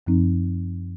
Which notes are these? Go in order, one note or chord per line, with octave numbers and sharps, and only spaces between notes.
F#2 F3 C4 D#4